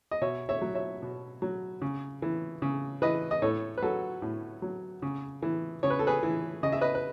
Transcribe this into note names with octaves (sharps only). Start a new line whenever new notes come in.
D#5
B2 C#5 E5
C#5 E5
F#3
C#5 E5
B2
F#3
C#3
E3
C#3
E3 B4 D#5
D#5
A2 A4 C#5
B4
F#3 F#4 A4
A2
F#3
C#3
E3
C#3 C#5
B4
A4
G#4 B4
E3
C#3 D#5
E5
B4 D#5
B4